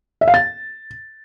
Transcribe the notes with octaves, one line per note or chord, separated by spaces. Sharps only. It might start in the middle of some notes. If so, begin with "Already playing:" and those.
E5
F5
A6